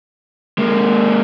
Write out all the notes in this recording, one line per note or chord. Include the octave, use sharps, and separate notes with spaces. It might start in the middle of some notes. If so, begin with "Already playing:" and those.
G#3 A#3